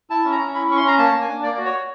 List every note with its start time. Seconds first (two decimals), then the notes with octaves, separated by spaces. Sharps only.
0.10 E4 A5
0.24 C#4
0.32 A#5
0.39 C#4
0.54 E4 B5
0.69 C#4 C#6
0.77 C6
0.84 C#4 A#5
0.98 A#3 A5
1.14 A#3
1.21 G#5
1.28 D4
1.43 A#3 D5
1.58 F#4
1.65 C#5
1.73 F#4